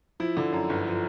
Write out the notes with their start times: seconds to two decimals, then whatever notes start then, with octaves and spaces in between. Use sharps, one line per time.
0.20 F3 E4
0.37 D3
0.52 F#2
0.69 G1
0.86 F3